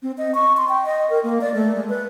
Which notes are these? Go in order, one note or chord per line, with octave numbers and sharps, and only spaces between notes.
C4
D#5
C#6
C6
G5
D#5
A#4
A#3
D5
A3
G#3
B4